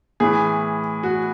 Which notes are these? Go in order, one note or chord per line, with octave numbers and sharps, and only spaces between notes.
A2 E3 G#4
F#4